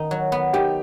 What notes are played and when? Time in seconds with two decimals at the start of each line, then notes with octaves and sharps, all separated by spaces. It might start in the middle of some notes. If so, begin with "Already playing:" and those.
Already playing: D#3 B3 D#4
0.11 F#3
0.32 B3
0.53 D#3 G4